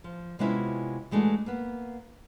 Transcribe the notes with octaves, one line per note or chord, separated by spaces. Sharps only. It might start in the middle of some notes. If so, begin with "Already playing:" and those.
F3
C3 G#3 B3 C#4 E4 F4
E3 G#3 A3 D4 F#4
A#3 B3